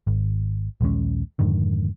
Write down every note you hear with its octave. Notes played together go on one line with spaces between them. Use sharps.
G#1
A#1 D#2 G#3 C#4
F2 G#2 D3 D#3